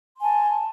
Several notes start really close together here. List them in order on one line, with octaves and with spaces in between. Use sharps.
C6 G#5 A5